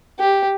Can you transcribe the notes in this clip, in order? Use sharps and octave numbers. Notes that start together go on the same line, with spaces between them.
G4